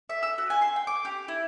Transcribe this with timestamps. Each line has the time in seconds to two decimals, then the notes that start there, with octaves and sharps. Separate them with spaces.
0.09 E5
0.23 E6
0.38 F#4
0.50 G#5
0.61 C6
0.76 G5
0.87 D6
1.05 G4
1.28 E4